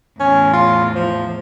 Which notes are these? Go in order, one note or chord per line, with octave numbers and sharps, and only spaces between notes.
E2 A2 C#4
F4
F3